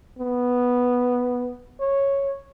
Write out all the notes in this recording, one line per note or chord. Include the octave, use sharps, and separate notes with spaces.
B3
C#5